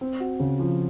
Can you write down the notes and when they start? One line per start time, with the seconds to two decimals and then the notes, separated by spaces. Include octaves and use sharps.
0.01 C4
0.20 F#4
0.40 C#3
0.59 F3